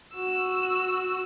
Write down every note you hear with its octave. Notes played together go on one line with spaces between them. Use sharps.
F#4 E6